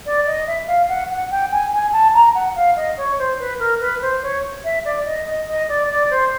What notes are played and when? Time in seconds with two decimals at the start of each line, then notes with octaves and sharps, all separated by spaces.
0.06 D5
0.26 D#5
0.47 E5
0.67 F5
0.89 F#5
1.10 F#5
1.31 G5
1.52 G#5
1.73 G#5
1.93 A5
2.14 A#5
2.35 F#5
2.56 F5
2.76 D#5
2.97 C#5
3.19 C5
3.39 B4
3.60 A#4
3.80 B4
4.02 C5
4.23 C#5
4.64 E5
4.85 D5
5.06 D#5
5.26 D#5
5.48 D#5
5.69 D5
5.89 D5
6.10 C5